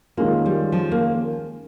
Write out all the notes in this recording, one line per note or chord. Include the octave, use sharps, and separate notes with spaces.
D#3 G#3 A#3 C#4 F4
G3
F3
A#3